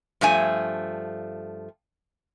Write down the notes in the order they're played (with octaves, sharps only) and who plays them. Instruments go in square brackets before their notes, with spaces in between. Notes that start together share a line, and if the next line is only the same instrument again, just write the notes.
[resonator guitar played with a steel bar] G2 F3 A3 G#5